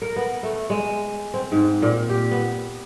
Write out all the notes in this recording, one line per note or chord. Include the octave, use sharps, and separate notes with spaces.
A#4
B3
A3
G#3
C4
G#2
A#2
G4
B3